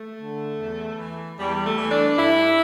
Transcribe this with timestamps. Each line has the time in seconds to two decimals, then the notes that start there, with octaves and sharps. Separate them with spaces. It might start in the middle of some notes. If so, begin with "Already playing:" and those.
Already playing: A3
0.19 D3
0.59 E2
0.98 E3
1.38 E2 G3
1.64 A3
1.77 E3
1.90 D4
2.16 G2 E4